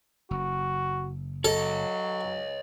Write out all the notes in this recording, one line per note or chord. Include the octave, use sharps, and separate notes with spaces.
F#1 F#4
F#3 A4 C#5 D#5